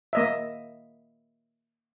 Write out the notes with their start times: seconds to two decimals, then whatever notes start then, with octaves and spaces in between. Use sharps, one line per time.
0.13 A#3 D#5 E5